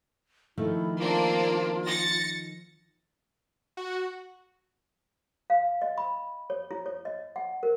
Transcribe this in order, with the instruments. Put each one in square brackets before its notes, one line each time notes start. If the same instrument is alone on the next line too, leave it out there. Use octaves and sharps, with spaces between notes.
[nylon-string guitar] D#3 F3 A3 [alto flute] E4
[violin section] A#3 C4 D4 [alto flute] F4
[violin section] A6 A#6 C#7
[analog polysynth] F#4
[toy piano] F5
D#5
B5
C#5
E4
C#5
D#5
F#5
A#4